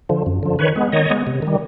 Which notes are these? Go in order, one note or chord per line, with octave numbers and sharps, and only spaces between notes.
D3 F3
F#2
D3 F3
D#3 B4 C#5
G#3 B3
D#3 C#5 D#5
G#3 B3
C3
D#3 G3